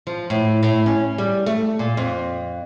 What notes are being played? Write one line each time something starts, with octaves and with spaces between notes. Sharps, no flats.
F3
A2
A2
C#4
G3
A3
A#2
F2